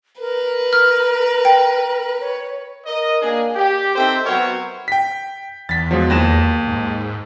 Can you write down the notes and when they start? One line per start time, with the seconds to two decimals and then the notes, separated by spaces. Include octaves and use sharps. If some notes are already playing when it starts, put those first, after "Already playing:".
0.20 A#4 B4
0.73 F6
1.45 G5
2.20 C#5
2.85 A#4 D#5
3.21 A#3 D4 G#4
3.55 G4
3.96 C4 D#4 A4 C5 E5 G5
4.26 F#3 B3 F#4 A#4 C5 C#5
4.88 G5 B6
5.69 E2 A6 B6
5.91 F3 F#3 G#3
6.10 D#2 A#6 E7
6.68 G#2